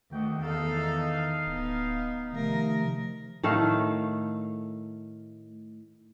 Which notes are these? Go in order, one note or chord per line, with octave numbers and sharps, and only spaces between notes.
D2 D#3 F#4 D#5 G5
E2 D#4 A4 F5
D1 B3
C3 D#3 F3 A3 D#4 A#4
A2 D#3 A3 F5